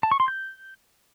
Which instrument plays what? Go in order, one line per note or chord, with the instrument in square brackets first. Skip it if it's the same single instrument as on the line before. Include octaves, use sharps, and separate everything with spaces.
[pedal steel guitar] A5
C#6
C6
G6